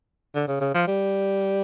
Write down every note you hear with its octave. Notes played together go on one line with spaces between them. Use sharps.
D3
C#3
C#3
F3
G3